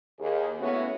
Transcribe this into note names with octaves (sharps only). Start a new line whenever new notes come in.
D#2 G#4
A3 B3 C#4 E4 F#4